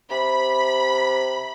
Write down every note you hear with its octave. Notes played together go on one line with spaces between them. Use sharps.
C3 B5